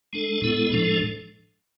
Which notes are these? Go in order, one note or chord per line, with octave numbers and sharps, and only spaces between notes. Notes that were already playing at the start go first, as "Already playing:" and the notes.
G#3 D4 A4
A2 G#3 B3 E4 A4
A2 F3 G#3 D4 A4